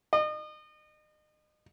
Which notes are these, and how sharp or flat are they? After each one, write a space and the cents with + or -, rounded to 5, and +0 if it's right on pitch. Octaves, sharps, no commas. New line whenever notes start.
D#5 -35